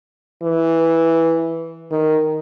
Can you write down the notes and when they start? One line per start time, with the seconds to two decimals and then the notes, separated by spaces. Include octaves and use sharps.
0.43 E3
1.91 D#3